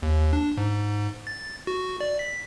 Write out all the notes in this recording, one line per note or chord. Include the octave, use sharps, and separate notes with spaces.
D#2
D4
G#2
A6
F#4
D5
B6